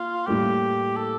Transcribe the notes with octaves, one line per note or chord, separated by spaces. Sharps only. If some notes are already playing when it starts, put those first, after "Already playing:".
Already playing: A#3 F4
A2 G3 A#3 G4
A4